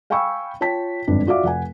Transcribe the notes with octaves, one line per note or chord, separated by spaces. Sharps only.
F5 G5 G#5 B5 C#6 E6
F4 C#5 G5 A5 B6
G1 F2 G#2 D4
F4 F#4 D5 E5 F5 D6
F1 F#5 G#5